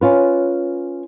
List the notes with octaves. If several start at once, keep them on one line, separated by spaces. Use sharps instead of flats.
C#4 F4 B4